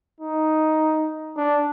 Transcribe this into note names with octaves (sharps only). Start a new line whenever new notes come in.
D#4
D4